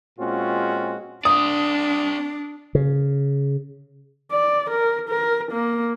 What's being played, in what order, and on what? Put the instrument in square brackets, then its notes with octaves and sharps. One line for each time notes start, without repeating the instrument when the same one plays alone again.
[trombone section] A#2 G#3 C4 C#4 F4 F#4
[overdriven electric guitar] C4 D5 [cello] D4 [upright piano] D#6
[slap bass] C#3
[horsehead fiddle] D5
A#4
A#4
A#3